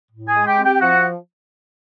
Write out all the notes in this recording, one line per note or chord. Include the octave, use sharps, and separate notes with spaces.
A2
G#4 G#5
G#3
G4 G5
C4
G4 G5
G5
F3 F#4 F#5